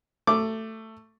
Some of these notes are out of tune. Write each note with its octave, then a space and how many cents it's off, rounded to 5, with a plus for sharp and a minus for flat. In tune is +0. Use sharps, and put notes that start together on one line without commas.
A3 +15 D6 +0